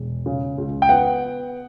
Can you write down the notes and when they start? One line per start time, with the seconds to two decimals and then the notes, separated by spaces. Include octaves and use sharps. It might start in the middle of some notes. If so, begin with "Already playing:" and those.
Already playing: E1
0.26 C#3
0.58 C#2
0.82 G5
0.89 B3 F#5